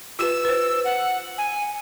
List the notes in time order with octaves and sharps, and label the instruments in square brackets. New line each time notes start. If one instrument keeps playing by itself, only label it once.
[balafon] F4 G4 B4 [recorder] E6
[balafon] B4 C5
[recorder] F#5
G#5